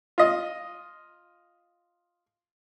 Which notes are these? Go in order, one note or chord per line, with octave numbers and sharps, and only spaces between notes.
F4 D#5